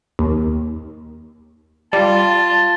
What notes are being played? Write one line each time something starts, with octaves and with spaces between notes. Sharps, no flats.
D#2
G3 F4 A5